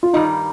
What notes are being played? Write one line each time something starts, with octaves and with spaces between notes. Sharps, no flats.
F4
G2 D#3 G3 D#4